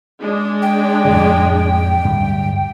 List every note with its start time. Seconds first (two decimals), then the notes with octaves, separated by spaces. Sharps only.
0.19 G#3 D4
0.62 G5
1.05 F2 A2 C3
2.05 D1 G2 G3